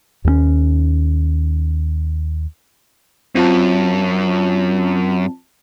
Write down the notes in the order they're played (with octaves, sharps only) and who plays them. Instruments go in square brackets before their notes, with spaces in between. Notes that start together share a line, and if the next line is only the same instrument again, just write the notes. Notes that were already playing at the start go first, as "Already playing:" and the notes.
[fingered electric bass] D#2 D#3 A#3 C#4
[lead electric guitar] F#2 [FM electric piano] C4 F4 A5